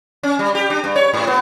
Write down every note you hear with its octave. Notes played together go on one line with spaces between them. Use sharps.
C#4
G3
G4
D4
G2
C#5
G#2
B3